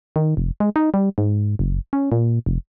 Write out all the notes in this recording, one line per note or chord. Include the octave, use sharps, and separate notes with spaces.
D#3
F1
G#3
D#4
G3
G#2
F#1
C#4
A#2
F1